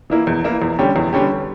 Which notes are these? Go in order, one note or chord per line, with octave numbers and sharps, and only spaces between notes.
E3 A#3 E4
E2
E3 A#3 E4
E2
D3 G3 C#4 G4
E2
D3 G3 C#4 G4